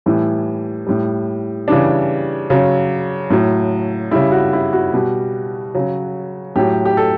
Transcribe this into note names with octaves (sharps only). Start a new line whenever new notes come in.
A2 E3 G3
A2 G3
C#3 E3 G3 D4
C#3 F#3
A2 F#3
C#3 G3 E4
F#4
E4
F#4
B2 G3
C#3 F#3
A2 F#3 G4
G4
A4